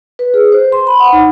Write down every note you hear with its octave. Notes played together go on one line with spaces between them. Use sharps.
B4
G#4
C5
C6
B5
F#5
D#4